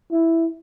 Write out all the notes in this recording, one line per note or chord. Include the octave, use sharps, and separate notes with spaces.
E4